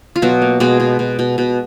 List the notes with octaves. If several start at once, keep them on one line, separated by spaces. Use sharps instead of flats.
F4
B2 F#3 F#4
A#3
B2 G#3 G#4
B2
B2
B2
B2